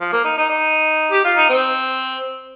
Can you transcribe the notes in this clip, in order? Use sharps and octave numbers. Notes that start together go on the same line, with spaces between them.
F3
A#3
D#4
D#4
D#4
G4
F4
D#4
C4